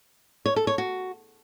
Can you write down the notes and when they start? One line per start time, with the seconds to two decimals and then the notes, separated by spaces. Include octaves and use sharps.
0.46 C#5
0.56 A4
0.67 C#5
0.78 F#4